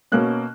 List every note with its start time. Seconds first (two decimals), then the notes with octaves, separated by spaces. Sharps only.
0.12 B2 A#3 C#4 F#6